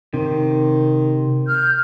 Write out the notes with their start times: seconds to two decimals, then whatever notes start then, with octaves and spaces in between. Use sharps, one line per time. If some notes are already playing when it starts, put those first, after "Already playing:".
0.14 C3 D#3
1.46 F6 G6